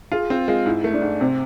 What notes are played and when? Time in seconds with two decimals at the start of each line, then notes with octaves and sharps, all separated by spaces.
0.12 F4 G#4
0.30 C4 F4
0.48 G#3 F4
0.66 G#2 E4
0.84 A3
0.94 D4
1.02 G#2
1.21 C3 C4